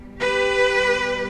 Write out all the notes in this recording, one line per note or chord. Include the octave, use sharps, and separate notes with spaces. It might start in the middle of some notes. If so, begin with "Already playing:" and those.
Already playing: B2 G3
G4 B4
B2 G3